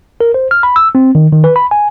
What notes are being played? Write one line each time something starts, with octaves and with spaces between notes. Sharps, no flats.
A#4
C5
F6
B5
E6
C4
D#3
D#3
B4
B5
G#5